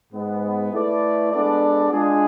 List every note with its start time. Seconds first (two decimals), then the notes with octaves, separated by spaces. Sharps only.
0.13 G#2 G#3 B3
0.72 A3 E4 B4 D5
1.32 G#3 B3 D4 A4 D5
1.92 G#3 D4 F4 G#4